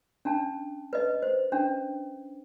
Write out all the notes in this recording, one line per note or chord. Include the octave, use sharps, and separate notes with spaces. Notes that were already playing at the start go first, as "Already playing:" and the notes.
C#4 D4 A5
B4 D#5
C5
C#4 D4